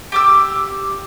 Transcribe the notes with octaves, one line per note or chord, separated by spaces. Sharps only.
G4 D6 E6